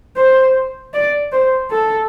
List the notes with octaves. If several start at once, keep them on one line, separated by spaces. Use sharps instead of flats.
C5
D5
C5
A4